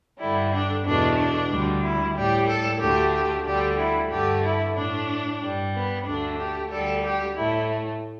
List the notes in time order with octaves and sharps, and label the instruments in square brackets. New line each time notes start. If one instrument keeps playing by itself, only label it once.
[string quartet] G2 D3 G3 E4
D4
E2 B2 A3 D4
D4
D2 D3 G3
E4
A2 G3 G4
A4
D2 D3 A3 G4
G4
D2 D3 G3 G4
E4
G2 D3 A3 G4
E4
A2 A3 D4
G2 G3
B3
D2 D3 A3 D4
G4
D2 D3 G3 A4
G4
A2 A3 E4